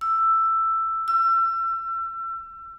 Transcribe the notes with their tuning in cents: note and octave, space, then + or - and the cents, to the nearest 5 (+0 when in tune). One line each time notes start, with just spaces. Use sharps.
E6 +10
E6 +35